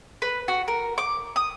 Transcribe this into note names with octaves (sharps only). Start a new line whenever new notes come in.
B4
F#4
A#4
D6
D#6